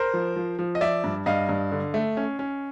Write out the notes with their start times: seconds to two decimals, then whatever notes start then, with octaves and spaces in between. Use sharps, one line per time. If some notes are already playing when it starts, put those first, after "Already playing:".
Already playing: A#4 C5
0.14 F3
0.36 F3
0.59 F3
0.75 D#5
0.81 F3 D5 E5
1.04 G2
1.26 G2 D#5 F5
1.49 G2
1.72 D3
1.94 A3
2.17 C#4
2.39 C#4